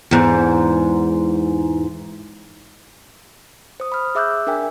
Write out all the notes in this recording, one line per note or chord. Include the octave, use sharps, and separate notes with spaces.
E2 G#2
C5 D#6
B5 F6
G#4 E5 D6 E6 F#6 G6
D4 A#4 E5 G5 G#5